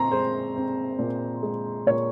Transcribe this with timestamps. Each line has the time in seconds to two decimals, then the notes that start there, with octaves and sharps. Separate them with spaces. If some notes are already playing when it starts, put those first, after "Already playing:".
Already playing: A#2 C4 A#5 C6
0.12 G#3 C5
0.56 C4
0.99 A#2
1.43 G#3
1.87 A#2 C#5